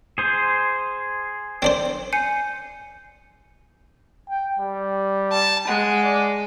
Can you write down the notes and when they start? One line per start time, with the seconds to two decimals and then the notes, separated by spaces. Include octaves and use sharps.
0.18 G#4 C5
1.62 C4 D4 C5
2.13 G#5 G6 C7 C#7 D#7
4.29 G5
4.59 G3
5.32 A5
5.68 G#3 F#5
6.04 D5